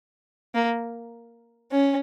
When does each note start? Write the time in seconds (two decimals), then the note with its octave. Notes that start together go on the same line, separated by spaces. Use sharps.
0.55 A#3
1.72 C#4